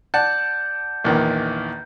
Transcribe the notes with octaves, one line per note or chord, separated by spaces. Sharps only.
D5 F#5 A5 G6
A#1 E2 D#3